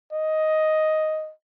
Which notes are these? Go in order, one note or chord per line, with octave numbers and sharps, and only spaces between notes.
D#5